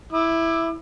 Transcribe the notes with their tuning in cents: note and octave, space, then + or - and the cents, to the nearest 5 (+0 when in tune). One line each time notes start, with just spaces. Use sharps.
E4 +0 D6 +30